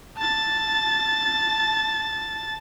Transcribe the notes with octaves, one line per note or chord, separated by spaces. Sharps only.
A5 A6